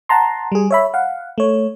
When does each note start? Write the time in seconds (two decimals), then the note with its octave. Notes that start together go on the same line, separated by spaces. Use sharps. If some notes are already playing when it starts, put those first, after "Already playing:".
0.09 F#5 A5 A#5 C6
0.52 G3 G#4
0.71 C#5 E5 B5
0.94 F5 F#5
1.38 A3 C#5